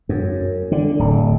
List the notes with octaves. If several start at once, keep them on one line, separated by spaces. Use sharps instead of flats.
F#2
D3
D1